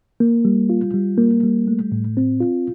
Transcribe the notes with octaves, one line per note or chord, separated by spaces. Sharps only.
A#3
G3
F4
G3
A#3
G3
A3
A2
C4
F4